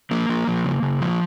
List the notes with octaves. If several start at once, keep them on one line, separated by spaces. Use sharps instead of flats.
F3 A#3
F3
F3
C#3
C#3
F3